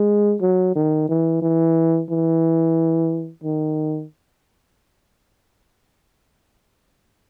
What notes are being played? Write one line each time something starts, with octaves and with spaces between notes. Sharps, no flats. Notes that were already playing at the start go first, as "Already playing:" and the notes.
Already playing: G#3
F#3
D#3
E3
E3
E3
D#3